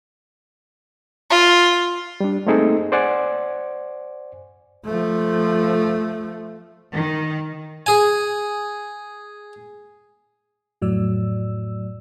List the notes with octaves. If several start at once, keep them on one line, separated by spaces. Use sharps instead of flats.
F4
G3 D4
A3 A#3 C4 D#4 G#4 A4
C5 D5 F#5 G#5
F3 A3
D#3
G#4 G#5
F2 A2 F#3 D5 E6